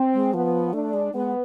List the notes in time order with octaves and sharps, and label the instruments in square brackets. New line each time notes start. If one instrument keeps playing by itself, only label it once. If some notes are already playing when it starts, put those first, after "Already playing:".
Already playing: [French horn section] C4
[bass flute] G#3
[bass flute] F3 [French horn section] B3
[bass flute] A3 [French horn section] D4
[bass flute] G#3
[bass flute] G#3 [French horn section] B3